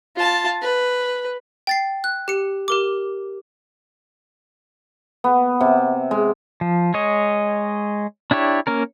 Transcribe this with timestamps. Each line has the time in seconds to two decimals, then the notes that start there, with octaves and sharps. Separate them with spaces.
0.16 F4 A5
0.61 B4
1.67 G5 A6 C7
2.04 F#6
2.28 G4 C#7
2.68 G4 A#4 D6
5.24 B3
5.61 C3
6.11 G#3
6.61 F3
6.94 G#3 C#5 D#5
8.31 D4 E4 G4 C#5
8.67 A#3 C#4 A#4